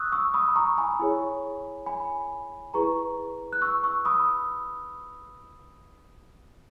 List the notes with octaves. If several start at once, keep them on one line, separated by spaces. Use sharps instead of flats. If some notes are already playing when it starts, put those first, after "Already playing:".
Already playing: C#6 D#6 E6 F#6
C#6 E6
B5 D#6
A#5 C#6
G#5 B5
E4 G#4 C#5
G#5 B5
E4 G#4 B4 A#5 C#6
F#6
C#6 E6
C#6 E6
B5 D#6